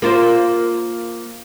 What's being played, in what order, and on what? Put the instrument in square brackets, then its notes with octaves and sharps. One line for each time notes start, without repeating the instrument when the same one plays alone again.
[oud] A#3 F4 C5